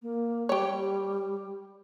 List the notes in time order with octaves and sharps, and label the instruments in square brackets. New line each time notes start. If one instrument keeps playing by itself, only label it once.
[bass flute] A#3
[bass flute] G3 [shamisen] G4 C#5